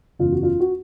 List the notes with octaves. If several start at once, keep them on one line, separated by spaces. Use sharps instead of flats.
F#1 E2 C#3 E3 F4
F#4
F4
F#4